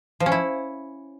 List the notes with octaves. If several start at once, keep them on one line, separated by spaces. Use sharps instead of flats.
F3
C#4
E4